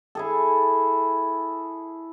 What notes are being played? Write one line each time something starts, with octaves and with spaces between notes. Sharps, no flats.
E4 G#4 A4